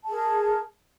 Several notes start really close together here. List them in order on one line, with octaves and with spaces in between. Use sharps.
A5 G#4 A#4